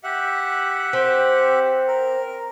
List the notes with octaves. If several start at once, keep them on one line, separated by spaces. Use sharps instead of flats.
G4 E5 F#5
C4
A#4